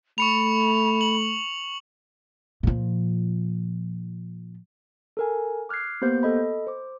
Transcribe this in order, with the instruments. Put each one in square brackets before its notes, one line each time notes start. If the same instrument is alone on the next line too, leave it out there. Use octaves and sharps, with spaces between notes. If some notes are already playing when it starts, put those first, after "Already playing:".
[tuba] A3 [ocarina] B5 [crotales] C#6 C#7 F7
[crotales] F#7
[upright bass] A#2 F3
[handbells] A4 A#4 G#5
D6 F6 F#6 G#6 C7
A#3 B3 G4 C5 G6
A4 D#5 B5
C5 D6